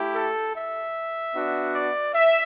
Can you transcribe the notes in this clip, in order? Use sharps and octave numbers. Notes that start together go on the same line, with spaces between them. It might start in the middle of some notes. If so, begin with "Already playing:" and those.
Already playing: A3 E4 G4
A4
E5
B3 D4 F#4
D5
E5